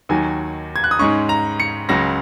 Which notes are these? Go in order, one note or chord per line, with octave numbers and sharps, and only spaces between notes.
D#2 D#3 F#3 G#5
G#6
F#6
D#6
G#2 G#3 C#4 C#6
A#5
C#7
C#2 C#3 F#3 A#6